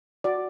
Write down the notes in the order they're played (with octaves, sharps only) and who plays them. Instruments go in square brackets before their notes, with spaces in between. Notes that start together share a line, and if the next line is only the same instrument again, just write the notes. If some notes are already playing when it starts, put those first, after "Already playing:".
[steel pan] F#4 D5